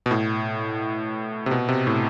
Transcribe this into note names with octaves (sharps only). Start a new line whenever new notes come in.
B2
A2
C3
B2
C3
A2